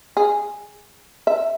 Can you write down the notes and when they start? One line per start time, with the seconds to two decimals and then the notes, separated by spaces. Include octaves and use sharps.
0.17 G#4
1.27 E5